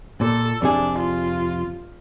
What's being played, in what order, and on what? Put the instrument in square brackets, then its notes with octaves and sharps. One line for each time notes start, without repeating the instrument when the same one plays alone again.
[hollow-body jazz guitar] A#2 [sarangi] A4
[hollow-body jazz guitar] F2 C3 G#4 [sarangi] D4
[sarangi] F4